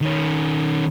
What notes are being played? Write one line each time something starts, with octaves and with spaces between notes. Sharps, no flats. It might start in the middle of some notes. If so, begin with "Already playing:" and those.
D#3 C#4